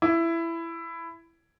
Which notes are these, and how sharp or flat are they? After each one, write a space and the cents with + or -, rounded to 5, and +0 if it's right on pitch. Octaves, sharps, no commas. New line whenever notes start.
E4 +15